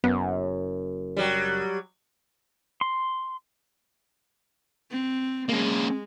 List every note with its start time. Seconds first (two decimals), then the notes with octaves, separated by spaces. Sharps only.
0.04 F#1 F#2 B3
1.16 F#3 G3
2.81 C6
4.91 C4
5.49 G#3 A#3 C#4